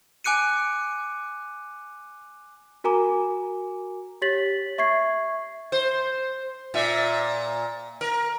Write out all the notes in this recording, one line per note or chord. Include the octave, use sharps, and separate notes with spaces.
G#5 D6 F#6 C#7 D#7
F#4 A#4 G#5 A#5 D6
G4 C#5 A6 B6 F#7
E5 C#6 G#6 C7
C5
A#2 E5
A#4